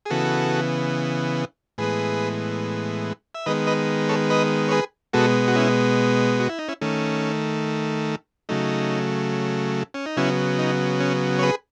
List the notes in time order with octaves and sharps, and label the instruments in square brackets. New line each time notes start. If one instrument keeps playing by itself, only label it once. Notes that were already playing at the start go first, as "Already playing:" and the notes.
[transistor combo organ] G#4
C#3 E3 B3 F#4 A4
A2 E3 G#3 B3 G#4 B4
E5
D#3 G#3 B3 B4 D#5
B4 D#5
A4 C#5
B4 D#5
C#5
G#4 B4
B2 G#3 B3 F#4 A4
F#4
C#4 E4
F#4
E4
D#4
C#4 E4
D#3 A3 C#4
C#3 F#3 A3 D#4
C#4
D#4
C#3 F#3 B3 C#4 E4
D#4
C#4
C#5
G#4 B4